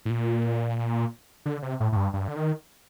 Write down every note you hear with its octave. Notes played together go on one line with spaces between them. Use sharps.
A2
A#2
D3
C3
A2
A2
G2
G2
D3
D#3